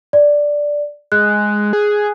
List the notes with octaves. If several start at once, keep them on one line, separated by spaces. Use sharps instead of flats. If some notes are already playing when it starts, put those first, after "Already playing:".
D5
G#3 F#6
G#4